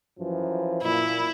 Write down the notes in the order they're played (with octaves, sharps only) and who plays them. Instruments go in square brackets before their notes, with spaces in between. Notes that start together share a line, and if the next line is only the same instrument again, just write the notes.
[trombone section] F#2 E3 F3
[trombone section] A#2 [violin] E4